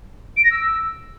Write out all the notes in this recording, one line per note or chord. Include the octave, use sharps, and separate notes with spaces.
D7
A#6
E6